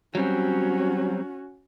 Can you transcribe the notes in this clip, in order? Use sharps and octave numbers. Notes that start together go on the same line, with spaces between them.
F#3 G3 C4 C#4 F#4